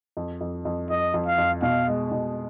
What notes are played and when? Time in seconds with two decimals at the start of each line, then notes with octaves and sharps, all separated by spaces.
0.17 F2
0.41 F2
0.65 F2
0.90 F2 D#5
1.14 F2
1.26 F5
1.38 F2
1.62 B2 F5
1.88 G#3
2.12 B2